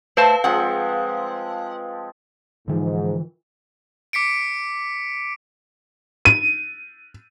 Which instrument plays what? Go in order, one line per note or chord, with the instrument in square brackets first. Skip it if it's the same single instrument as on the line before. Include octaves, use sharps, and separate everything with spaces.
[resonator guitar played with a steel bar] A3 C5 A5 [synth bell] B4 F5
[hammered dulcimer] F3 G#3 C4 [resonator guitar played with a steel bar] F#5
[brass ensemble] G#2 [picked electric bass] D3 E3 F3
[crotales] D6 B6 C#7 D7
[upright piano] D#7